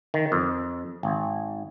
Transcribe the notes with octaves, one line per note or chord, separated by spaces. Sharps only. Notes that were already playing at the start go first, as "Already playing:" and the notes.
D#3
F2
G#1